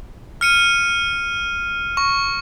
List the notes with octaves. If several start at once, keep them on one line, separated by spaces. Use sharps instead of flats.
F6 C#7 D#7
C#6